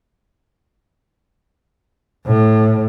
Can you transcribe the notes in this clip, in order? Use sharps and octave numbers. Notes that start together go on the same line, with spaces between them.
A2